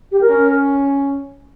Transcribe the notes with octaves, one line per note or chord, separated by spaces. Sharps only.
G4
A#4
C#4